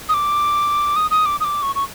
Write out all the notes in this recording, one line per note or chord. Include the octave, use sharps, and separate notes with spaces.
D#6
D6
D#6
D#6
D6
D#6
D6
C#6
C#6